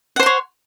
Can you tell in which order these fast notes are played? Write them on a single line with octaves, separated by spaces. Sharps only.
F#5 C5 C6 C#5